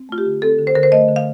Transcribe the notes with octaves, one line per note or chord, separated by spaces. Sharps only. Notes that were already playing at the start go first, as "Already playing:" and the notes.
Already playing: C4
A3 F4
G4
D3
C4 A4
D3
C5
D3 A#4
C5
A3 D#5
D3
F5